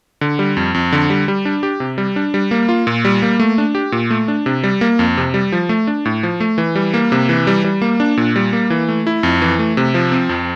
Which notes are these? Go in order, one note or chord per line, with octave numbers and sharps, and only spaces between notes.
D3
G3
F2
F2
D3
G3
G3
D4
G4
C3
G3
D4
G3
A#3
F4
A#2
G3
A#3
A3
D4
G4
A#2
A3
D4
C3
G3
A#3
F2
C3
G3
F3
A3
D4
A2
F3
A3
E3
G3
A#3
C3
E3
G3
G3
A#3
D4
A#2
G3
A#3
E3
A3
E4
F2
E3
A3
C3
F3
C4
F2